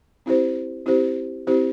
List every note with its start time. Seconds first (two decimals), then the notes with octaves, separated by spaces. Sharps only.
0.26 C4 E4 G4 C5
0.86 C4 E4 G4 C5
1.47 C4 E4 G4 C5